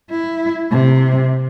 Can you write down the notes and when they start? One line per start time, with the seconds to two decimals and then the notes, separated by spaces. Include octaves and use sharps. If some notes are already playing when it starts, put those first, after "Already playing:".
0.11 E4
0.71 C3